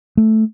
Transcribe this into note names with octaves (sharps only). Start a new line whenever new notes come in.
A3